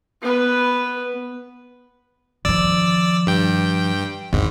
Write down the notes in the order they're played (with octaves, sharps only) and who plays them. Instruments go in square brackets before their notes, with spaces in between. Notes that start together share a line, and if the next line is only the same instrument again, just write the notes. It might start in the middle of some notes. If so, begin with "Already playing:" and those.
[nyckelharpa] B3 B4
[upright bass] D#3 F3 [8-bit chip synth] D5 E6
[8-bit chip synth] G2 G5
[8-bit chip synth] G#1 G#2 [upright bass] E2 D3